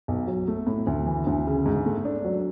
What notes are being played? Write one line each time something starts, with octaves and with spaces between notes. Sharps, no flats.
B1
F#3
A3
A2
D2
E3
D2
C#3
G#2
A3
D4
F#3